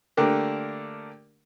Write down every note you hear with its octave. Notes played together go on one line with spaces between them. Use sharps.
D3 A3 A#3 D4 G4 A#4